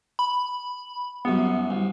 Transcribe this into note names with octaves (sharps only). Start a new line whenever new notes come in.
B5
C2 F#2 B3
C2